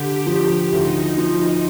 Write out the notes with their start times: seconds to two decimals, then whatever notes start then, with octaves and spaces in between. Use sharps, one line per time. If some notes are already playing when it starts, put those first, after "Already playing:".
Already playing: D3 G4
0.27 F3
0.73 D2 D#4
1.18 F3